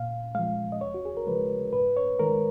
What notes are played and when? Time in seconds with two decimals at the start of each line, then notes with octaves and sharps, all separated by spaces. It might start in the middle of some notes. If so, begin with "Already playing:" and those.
Already playing: A#2 F5
0.35 F3 G#3 F5
0.72 D#5
0.80 D#2 C#5
0.94 F#4
1.05 G#4
1.17 A#4
1.27 C#3 F3 G#3 B4
1.73 G#2 B4
1.97 C#5
2.19 D#3 G#3 A#4